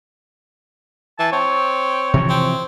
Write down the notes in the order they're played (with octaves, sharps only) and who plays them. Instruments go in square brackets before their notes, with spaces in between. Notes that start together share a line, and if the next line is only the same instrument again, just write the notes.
[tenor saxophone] E3 [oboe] A5
[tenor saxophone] C4 [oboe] C#5
[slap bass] C3 E3 F3
[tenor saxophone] C4